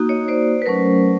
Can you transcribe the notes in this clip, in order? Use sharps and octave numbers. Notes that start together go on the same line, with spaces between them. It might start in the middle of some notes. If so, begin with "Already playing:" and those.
Already playing: A#3 D#4 F#4
C#5 D#5
C5 D5
B4
F#3 A3 C#4 A#4 C5